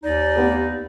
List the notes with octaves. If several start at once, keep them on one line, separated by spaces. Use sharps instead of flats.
D#2 D#4 D5
B3 G4